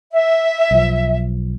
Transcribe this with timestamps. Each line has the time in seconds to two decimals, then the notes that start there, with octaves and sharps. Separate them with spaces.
0.12 E5
0.71 B1 F3